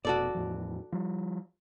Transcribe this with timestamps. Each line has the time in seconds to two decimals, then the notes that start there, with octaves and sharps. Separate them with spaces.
0.05 F1 B2 F#4 A4 D5
0.35 E2 A2 F3
0.92 F3 G3